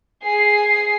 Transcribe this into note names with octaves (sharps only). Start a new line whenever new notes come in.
G#4 C7